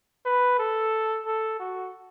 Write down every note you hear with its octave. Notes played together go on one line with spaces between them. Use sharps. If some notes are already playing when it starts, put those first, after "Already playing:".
B4
A4
A4
F#4